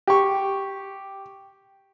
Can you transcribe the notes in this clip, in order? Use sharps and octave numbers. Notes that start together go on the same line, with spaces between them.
G4 C#6